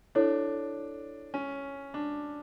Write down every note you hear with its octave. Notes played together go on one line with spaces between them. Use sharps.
D4 E4 A4 C#5
C#4
D4